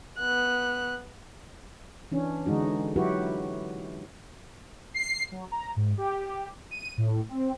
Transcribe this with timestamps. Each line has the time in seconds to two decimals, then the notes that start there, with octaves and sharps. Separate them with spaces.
0.19 B3 F#6
2.12 E3 C#4 D4
2.46 D3 E3 G#3 D#4 F#4
2.96 F#3 E4 F#4 G4 B4
4.94 C7
5.32 F#3
5.52 A#5
5.76 G#2
5.97 G4
6.71 D#7
6.98 A2
7.29 C4